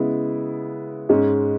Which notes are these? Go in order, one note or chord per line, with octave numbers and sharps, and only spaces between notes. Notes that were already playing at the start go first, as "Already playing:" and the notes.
Already playing: C#3 G#3 B3 E4
G#2 G#3 C#4